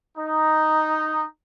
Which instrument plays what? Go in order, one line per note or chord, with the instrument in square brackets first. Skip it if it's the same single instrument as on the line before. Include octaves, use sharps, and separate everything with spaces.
[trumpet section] D#4